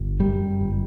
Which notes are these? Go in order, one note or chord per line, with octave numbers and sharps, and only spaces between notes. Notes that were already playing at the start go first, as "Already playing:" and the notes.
Already playing: G1
F#2 G3
G1